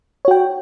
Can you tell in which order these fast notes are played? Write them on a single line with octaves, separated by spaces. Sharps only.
C#5 F#4 G5